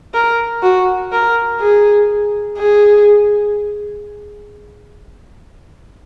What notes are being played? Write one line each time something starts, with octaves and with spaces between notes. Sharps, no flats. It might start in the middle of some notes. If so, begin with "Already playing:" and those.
A#4
F#4
A#4
G#4
G#4